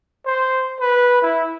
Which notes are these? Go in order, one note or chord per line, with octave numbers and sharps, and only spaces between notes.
C5
B4
E4